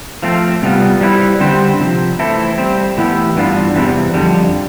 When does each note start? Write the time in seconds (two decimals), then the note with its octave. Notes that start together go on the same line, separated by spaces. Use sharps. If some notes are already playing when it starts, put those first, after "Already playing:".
0.23 F3 A3 C4
0.63 C3 G3 B3 F4
1.01 G3 C4 E4 B4
1.40 D3 G3 C4 G4 C5
1.79 C3 F3 C4
2.19 E3 A3 C4 E4 A4
2.58 G3 C4 G4 C5
2.97 A2 E3 B3 E4 G4
3.37 G2 E3 B3 D4 F4
3.76 E2 C3 E3 G3
4.14 F2 D3 G3